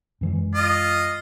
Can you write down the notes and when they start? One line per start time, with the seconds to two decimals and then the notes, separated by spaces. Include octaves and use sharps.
0.21 F#2 E3 G#3
0.55 F4 D#5